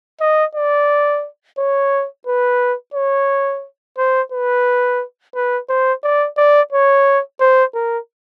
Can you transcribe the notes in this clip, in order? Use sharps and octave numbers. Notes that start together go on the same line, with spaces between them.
D#5
D5
C#5
B4
C#5
C5
B4
B4
C5
D5
D5
C#5
C5
A#4